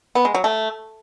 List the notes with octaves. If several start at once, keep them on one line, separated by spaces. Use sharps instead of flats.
B3
G#3
F#3
A3